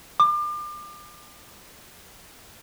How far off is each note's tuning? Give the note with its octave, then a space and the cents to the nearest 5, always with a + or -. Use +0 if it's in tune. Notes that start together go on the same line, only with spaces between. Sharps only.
D6 +35